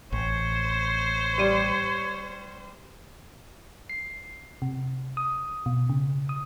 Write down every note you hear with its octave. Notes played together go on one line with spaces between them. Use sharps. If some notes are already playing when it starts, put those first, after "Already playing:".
A1 C5 C#5
G3 D5 D#7
C7
C3
D#6
B2
C#3
D#6